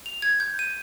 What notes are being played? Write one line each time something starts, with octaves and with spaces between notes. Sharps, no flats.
F7
G#6
G6
D#7